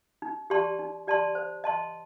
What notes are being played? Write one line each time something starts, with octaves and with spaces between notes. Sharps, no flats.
D#4
G4 D5 A5 C6
D#4
G4 D5 A5 C6
C5
D#5 A5 C6